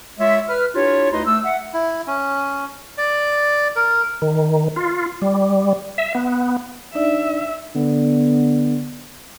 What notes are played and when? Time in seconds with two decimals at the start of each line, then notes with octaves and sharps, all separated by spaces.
0.19 G#3 F4 C#5 E5
0.49 B4 F6
0.75 D4 E4 F4 G4 C#5
1.13 D2 D#4 E4 B4 D#5 C6
1.26 A3 E6
1.45 E5 F#5
1.74 E4
2.07 C#4
2.98 D5
3.76 A#4
4.22 D#3
4.76 F4
5.22 G3
5.98 E5
6.15 B3
6.95 D4 D#4 D5 E5
7.75 D3 B3